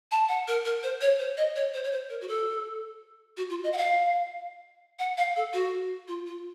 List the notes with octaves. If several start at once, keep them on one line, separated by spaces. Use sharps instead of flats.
A5
F#5
A#4
A#4
C5
C#5
C5
D#5
C#5
C5
C#5
C5
A#4
F#4
A4
F#4
F4
D#5
F#5
F5
F#5
F5
A4
F#4
F4
F4